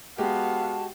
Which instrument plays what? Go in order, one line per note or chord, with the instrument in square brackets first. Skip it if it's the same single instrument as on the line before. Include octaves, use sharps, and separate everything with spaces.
[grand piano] G#3 G4 [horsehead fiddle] B3 F5 [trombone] F#4 [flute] A5